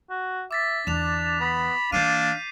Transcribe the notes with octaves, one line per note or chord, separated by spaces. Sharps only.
F#4
E5 D6 A6 B6
E2 D3 D4 E7 F7
B3 B5
E3 A#3 D4 F5 G6 C7 D#7